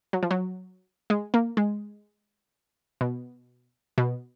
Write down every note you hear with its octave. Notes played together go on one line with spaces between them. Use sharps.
F#3
F3
F#3
G#3
A#3
G#3
B2
B2